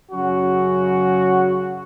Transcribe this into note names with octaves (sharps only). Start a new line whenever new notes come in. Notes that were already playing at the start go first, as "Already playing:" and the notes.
F#2 C#3 F#3 C#4 F#4